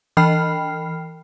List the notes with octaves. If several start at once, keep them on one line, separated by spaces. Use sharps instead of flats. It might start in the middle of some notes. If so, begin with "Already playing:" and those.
E3 G5 B5 F6 C7